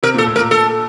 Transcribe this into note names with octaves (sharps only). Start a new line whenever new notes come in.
C3 A#4
A#2 A4
A2
A#4
A#2
A4